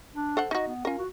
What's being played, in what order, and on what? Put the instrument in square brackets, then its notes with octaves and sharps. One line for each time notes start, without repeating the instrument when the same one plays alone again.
[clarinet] D4
[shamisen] A4 C5 F#5
[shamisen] D#4 F#4 [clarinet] D#5
[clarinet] B3
[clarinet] C#4 [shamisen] F4 A#4
[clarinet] F#4